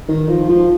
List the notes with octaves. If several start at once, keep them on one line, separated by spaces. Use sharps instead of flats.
D#3
F3
F3